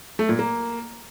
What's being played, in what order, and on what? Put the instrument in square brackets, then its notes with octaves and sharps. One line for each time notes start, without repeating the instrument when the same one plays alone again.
[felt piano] A3
A#2
A#3